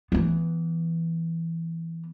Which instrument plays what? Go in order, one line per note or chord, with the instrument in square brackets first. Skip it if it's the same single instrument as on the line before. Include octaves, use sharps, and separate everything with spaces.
[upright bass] E3 B3